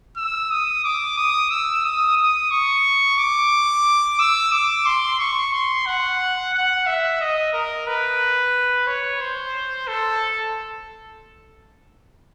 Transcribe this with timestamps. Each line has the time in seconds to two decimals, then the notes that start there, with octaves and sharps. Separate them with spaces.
0.17 E6
0.51 D#6
0.84 D6
1.17 D#6
1.51 E6
1.85 D#6
2.17 D#6
2.51 C#6
3.18 D6
4.19 E6
4.52 D6
4.86 C6
5.19 C#6
5.53 C6
5.86 F#5
6.53 F#5
6.86 E5
7.20 D#5
7.53 A#4
7.87 B4
8.87 C#5
9.21 C5
9.88 A4